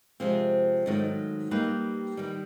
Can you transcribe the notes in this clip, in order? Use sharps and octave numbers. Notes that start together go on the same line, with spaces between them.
C3 F3 G#3 C4
G#2 D#3 F#3 A3
G3 A#3 D#4 G4 B4
D#3 G3